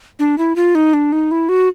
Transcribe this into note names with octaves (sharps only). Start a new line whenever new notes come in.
D4
E4
F4
D#4
D4
D#4
E4
F#4